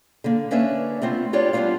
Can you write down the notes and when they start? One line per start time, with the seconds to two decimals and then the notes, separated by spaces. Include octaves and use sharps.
0.24 D3 A#3
0.51 A#3 C#4 D4 B4 C#5 E5
1.02 A3 B3 C4 F4
1.33 D4 F4 G4 C#5 D5
1.53 G3 B3 D4 F4 F5